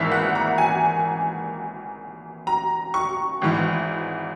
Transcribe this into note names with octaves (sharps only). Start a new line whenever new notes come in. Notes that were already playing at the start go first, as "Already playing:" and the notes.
Already playing: G#1 G#2 E3 A#3 E5
F#5
A#5
G#5
A#5
C#6
G#1 G#2 E3